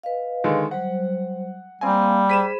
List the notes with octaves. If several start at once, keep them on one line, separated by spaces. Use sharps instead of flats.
B4 D#5 F5
D3 D#3 G#3
F#3 G3 C5 F#5
G3 A#3 C4 F5 G#5
G#4 C5 B5 B6 D#7 E7